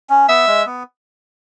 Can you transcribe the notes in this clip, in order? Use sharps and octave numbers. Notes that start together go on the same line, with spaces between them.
C#4
B3 E5
G#3
B3